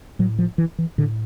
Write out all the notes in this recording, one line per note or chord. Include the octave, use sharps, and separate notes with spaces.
A2 F#3
F3
E3
E3
A2 D3